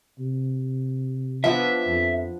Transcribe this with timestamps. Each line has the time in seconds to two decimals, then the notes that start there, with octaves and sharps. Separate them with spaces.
0.19 C3
1.44 F3 B3 D4 E5
1.88 F2